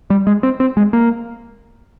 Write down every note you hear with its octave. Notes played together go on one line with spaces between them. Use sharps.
G3
G#3
C4
C4
G#3
A#3